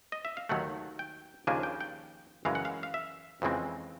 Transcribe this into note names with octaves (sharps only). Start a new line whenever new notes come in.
D#5
E5
F5
D#2 D#3 F#3 A3 F#5
G5
D#2 C#3 F3 A#3 D4 G#5
G5
G5
F#2 C#3 E3 G#3 F5
F#5
F5
F5
E5
F2 C#3 E3 G#3 C4